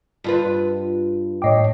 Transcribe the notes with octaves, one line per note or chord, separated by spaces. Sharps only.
G2 F4 B4
A2 C#5 D#5 G5 D6